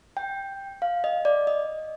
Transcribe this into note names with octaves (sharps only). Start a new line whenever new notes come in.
G5
F5
D#5
D5
D#5